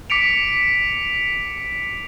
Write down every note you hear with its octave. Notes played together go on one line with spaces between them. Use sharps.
D6 B6 C#7 D7 F7